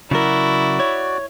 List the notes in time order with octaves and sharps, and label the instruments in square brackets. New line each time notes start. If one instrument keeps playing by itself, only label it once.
[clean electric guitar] C#3 F#3 A#4 [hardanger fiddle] E4 [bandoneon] F#4 D5
[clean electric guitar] C#5